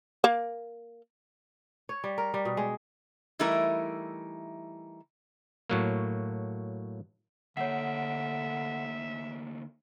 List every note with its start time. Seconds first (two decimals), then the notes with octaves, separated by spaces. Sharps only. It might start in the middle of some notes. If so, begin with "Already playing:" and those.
0.24 A#3
1.89 C#5
2.04 G3
2.18 A#4
2.34 G3
2.45 B2
2.57 G#3
3.39 E3 G3 A3 D#4 E4 A#4
5.70 A2 F#3 A#3
7.57 D2 D3 A#3 C#5 E5 F#5